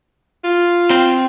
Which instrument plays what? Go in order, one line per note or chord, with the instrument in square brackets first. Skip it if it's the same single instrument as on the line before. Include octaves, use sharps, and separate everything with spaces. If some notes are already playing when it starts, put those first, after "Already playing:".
[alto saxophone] F4
[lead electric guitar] C4 G5